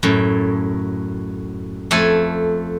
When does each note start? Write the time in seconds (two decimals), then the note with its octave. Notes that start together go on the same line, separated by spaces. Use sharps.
0.03 F#2 A2
1.91 F2 A3 A4 G#5